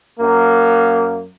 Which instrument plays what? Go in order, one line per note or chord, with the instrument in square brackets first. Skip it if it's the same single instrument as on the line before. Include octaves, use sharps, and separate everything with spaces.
[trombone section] F#2 A#3